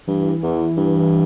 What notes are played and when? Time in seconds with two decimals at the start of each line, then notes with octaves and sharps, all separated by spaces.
0.07 G2 E3
0.43 E2 E3
0.77 G2 E3